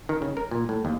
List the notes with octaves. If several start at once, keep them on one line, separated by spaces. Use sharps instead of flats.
D#3
C#3
A#4
A#2
A2
D#2